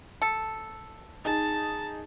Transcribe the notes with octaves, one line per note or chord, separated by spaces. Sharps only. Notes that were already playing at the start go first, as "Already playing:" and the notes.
A4
D#4 G#4 A5